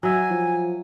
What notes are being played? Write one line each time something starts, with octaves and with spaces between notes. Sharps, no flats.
F#3 E5 G#5
F3